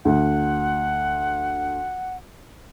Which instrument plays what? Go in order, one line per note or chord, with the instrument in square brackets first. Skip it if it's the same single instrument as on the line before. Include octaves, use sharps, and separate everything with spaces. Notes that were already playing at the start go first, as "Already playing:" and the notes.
[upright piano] D2 [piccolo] F#5